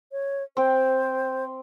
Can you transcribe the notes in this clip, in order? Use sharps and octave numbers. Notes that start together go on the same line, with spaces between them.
C#5
C4 C5 G5